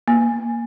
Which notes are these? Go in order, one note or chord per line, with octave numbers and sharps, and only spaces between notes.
A#3